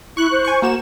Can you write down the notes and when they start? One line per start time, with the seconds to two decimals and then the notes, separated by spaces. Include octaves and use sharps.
0.17 E4 C#6 F#6
0.32 C5
0.45 G#5 C#6
0.62 A#3 F#4 E7